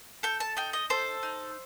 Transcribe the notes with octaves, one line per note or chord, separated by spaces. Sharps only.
A4 G5
A5
D#4 G5
D#5
A4 C5
D#4